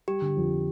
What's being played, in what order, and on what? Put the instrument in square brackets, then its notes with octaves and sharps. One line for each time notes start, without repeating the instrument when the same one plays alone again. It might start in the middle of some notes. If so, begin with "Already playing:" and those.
[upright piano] G3 [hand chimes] G4
[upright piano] D3
F2